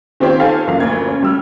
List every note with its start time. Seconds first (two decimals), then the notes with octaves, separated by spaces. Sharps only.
0.20 D#3 C4 F4 G4 C#5
0.39 A4 F5 G5 G#5
0.67 F#1 F#2 F3 A#3 F5
0.80 D2 A#2 G#6
1.07 C#4
1.23 G3 E6 F6